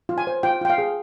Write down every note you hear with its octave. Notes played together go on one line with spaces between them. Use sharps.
F4
G#5
C5
F4 G5
F4 G5
F5
G#4